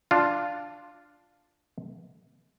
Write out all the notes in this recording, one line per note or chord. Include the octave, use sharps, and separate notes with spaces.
D4 F4